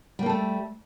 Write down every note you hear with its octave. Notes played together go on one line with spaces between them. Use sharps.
G3 A3 A#3 A4